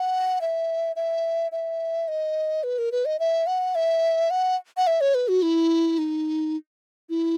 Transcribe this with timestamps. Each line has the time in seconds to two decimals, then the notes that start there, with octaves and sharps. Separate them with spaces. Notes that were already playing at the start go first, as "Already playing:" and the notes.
Already playing: F#5
0.41 E5
0.96 E5
1.52 E5
2.08 D#5
2.64 B4
2.78 A#4
2.92 B4
3.05 D#5
3.19 E5
3.47 F#5
3.75 E5
4.30 F#5
4.77 F#5
4.87 E5
5.01 C#5
5.15 B4
5.28 F#4
5.42 E4
5.98 D#4
7.09 E4